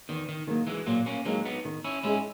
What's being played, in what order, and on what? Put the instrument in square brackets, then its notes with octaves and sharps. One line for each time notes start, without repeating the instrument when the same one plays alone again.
[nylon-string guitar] E2 [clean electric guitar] D#3
[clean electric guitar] D#3
[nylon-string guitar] D#3 F#3 A#3
[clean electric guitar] E3 G#3
[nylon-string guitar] A#2 [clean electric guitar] F#3 A#3
[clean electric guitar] A#3 C#4
[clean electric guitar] F#3 A#3 [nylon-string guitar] G#3 D#4 A#4
[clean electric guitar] B3 D#4
[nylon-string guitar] D#3
[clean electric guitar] C#4 E4
[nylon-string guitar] G#3 D#4 G#4 D#5 [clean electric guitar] C#4 E4